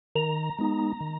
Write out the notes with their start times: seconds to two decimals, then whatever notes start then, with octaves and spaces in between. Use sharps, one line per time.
0.16 D#3 A#5
0.59 G#3 B3 D#4
1.01 D#3